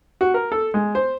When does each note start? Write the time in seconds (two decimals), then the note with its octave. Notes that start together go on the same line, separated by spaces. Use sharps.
0.21 F#4
0.34 A#4
0.52 A4
0.74 G#3
0.95 C5